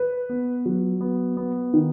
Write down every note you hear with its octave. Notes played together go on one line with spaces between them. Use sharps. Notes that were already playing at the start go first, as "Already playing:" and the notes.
Already playing: B4
B3
F#3
B3
B3
D#3